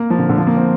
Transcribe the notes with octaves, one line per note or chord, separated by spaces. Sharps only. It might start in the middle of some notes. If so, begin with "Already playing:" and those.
Already playing: A#3
F3
D3
D3
F3
A#3
C4